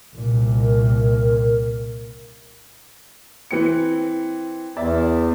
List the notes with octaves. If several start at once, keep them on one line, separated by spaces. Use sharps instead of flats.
C2 A#2
A#4
E3 C4 C#7
E2 D5 E5